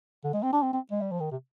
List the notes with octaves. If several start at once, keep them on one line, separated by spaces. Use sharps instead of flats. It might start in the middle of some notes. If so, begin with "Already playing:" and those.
D3
G#3
C4
D4
C4
C4
G#3
G3
F3
D#3
C3